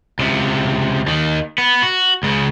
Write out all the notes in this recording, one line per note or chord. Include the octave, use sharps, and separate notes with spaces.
C#2 C3
D#2 D#3
B3
F#4
C#2 C#3